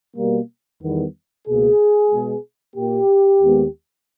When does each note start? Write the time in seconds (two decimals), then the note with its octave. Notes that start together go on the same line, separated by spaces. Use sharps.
0.17 B2 G3 A#3
0.81 E2 D#3 G3 B3
1.47 C#2 B2 A#3 G#4
2.12 B2 G#3 B3
2.76 A#2 A#3 G4
3.40 D#2 D#3 G#3 B3